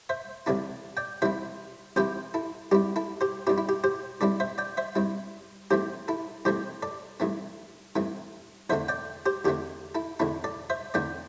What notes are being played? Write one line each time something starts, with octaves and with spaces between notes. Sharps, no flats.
C5 E5
C2 C3 E3 C4 E4 A4 D5
D5 G5
C2 C3 E3 C4 E4 C5 E5
C2 C3 E3 C4 E4 G4 C5
E4 A4
G2 G3 C4 E4 G4
E4 A4
G4 C5
G2 G3 C4 E4 G4
E4
G4
G4 C5
G2 G3 C4 E4 A4 D5
C5 E5
D5 G5
C5 E5
G2 G3 C4 E4
G2 E3 A3 C4 G4 C5
E4 A4
G2 E3 A3 C4 G4 C5
A4 D5
G2 E3 A3 C4
G2 E3 A3 C4
E2 D3 A3 C4 C5 E5
D5 G5
G4 C5
E2 D3 A3 C4 G4
E4 A4
E2 D3 A3 C4 E4 A4
A4 D5
C5 E5
E2 D3 A3 C4 D5 G5